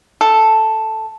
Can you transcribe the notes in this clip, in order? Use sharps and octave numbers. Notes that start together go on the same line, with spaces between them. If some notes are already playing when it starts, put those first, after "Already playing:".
A4